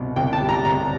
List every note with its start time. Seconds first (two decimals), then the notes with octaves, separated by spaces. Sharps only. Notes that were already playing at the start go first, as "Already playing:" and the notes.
Already playing: C2 B2
0.16 C2 G5
0.33 A5
0.40 G3
0.49 A#5
0.65 C2 A#5